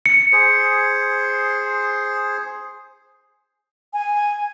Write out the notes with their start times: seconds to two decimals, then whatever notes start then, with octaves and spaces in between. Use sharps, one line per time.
0.06 C#7
0.32 G#4 C5
3.93 G#5